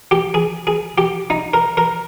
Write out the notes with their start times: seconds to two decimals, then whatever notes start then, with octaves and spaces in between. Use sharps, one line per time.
0.11 G4
0.34 G#4
0.67 G#4
0.98 G4
1.30 D#4
1.54 A#4
1.77 A#4